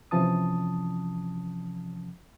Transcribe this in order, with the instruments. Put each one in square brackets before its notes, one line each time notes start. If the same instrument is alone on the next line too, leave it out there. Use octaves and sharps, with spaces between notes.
[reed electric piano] C3 E3 F3 C#4 A5 D#6